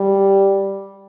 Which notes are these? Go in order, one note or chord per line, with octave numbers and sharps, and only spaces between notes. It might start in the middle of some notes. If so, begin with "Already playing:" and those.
Already playing: G3